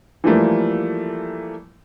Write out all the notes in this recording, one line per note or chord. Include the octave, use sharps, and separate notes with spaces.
E3 F3 G3 A3 A#3